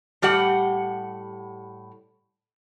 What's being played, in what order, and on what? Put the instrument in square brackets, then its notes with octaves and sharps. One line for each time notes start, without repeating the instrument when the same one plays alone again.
[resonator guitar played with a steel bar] A2 G3 G4 F#5